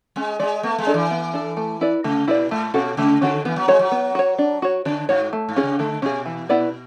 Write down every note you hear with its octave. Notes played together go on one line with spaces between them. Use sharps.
G#3 C#4
G#3 G#4 D5
A3 B3
G#3
D4 A4
E3
B3
D4 A4
A3
E4 B4 D5
C#3 A3
B2 E4 B4 D5
A2 A3
B2 C#4 F#4 A4
C#3 A3
D3 C#4 F#4 A4
E3 B3
F#3
G#3 F#4 C#5
F#3
B3
F#4 C#5
D4
F#4 C#5
D3 D4
G#2 F#4 C#5
A3
G#2
C#4 G#4
C#3
D3 A3
B2 C#4 G#4
E3
B3 E4 B4 D5